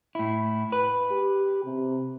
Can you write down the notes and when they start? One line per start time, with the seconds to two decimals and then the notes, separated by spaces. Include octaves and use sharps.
0.15 A2 E4
0.72 B4
1.11 G4
1.64 C3